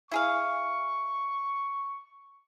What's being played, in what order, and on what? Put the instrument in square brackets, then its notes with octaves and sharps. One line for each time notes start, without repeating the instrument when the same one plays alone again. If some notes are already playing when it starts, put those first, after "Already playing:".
[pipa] E4 G#4 F5 [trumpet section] C#6